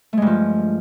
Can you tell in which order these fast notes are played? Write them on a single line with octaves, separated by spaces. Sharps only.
A3 G#3 G2 F3